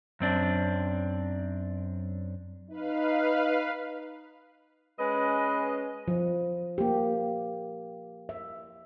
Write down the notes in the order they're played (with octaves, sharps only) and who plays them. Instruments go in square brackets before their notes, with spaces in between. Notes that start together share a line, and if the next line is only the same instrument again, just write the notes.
[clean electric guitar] F#2 C4 D4
[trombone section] D#4 [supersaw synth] B4 F5
[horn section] G#3 C#4 D#5 [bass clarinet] B4
[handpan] F3
A#3 G4
E5